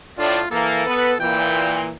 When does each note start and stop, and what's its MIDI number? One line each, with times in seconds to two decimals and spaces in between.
0.18 0.40 45
0.18 0.40 62
0.18 0.47 65
0.51 0.86 52
0.51 0.86 58
0.51 1.17 69
0.86 1.12 59
0.86 1.12 71
1.20 1.91 46
1.20 1.91 52
1.20 1.80 79